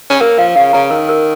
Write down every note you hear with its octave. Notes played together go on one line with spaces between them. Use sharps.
C#4
A#3 A#4
F3 F5
C#3 F5
C#3 A#5
D#3 A#4
A#4